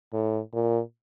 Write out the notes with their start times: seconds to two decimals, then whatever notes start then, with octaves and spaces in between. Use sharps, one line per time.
0.13 A2
0.53 A#2